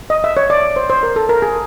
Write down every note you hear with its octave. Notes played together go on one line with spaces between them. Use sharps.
D#5
E5
C#5
D5
C5
C5
A#4
A4
A#4
G#4